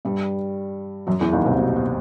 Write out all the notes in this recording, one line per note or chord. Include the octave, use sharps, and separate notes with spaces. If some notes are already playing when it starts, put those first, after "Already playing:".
G2 G3
F#2 F#3
E2 E3
D#2 D#3
C2 C3
B2
B2